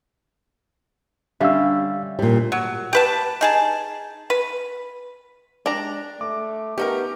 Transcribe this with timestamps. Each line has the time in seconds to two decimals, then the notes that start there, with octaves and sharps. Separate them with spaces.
1.40 D3 G3 C#4 E5 F5 E6
2.19 A#2 G3
2.52 F#3
2.93 G4 B4 A5
3.41 D#4 G#4 A5
4.30 B4
5.66 G#3 D4 G4 A#5
6.21 A3 D6
6.78 B3 C#4 D#4 G4 A#4